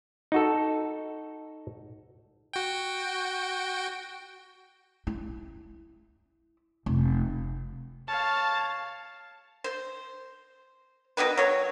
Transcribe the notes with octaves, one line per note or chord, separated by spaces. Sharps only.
D#4 F#4 A4
F#4 G5
E4
F1
C#5 F5 A5
C5
B2 D#3 B3 B4
F#3 C#5